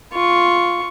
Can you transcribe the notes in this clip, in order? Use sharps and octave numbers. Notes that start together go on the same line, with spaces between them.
F4 C#6